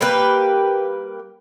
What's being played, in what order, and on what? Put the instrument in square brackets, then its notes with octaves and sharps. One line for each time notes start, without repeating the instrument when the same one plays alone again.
[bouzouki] G3 A#3 G4 B4